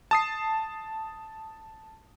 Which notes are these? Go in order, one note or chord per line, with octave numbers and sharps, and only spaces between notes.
A5 D#6 C7